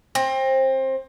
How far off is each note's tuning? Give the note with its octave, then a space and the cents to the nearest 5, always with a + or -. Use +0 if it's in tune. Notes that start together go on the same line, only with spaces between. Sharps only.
C4 +25